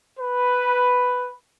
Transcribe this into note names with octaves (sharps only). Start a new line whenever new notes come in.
B4